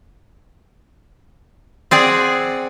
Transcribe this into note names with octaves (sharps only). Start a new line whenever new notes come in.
C4 G#4 D5 F#5